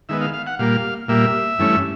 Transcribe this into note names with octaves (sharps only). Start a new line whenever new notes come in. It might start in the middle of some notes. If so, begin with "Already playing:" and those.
D#3 G#3 B3 E5
F5
F5
F#5
A#2 G3 A#3 F5
A#2 G3 A#3 E5
G2 E3 A3 C#4